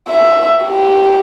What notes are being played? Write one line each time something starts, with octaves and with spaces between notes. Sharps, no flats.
E5
G4